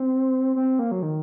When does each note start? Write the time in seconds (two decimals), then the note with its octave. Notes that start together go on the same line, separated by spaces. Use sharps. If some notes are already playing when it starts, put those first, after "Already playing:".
Already playing: C4
0.56 C4
0.79 A#3
0.92 F#3
1.02 D#3